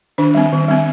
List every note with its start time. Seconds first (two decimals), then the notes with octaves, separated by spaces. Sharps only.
0.18 D#3 D4
0.35 G3 C4
0.52 D#3
0.68 G3 C4